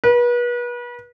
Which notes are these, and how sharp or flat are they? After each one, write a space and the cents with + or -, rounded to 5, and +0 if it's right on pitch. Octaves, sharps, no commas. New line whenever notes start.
B4 -35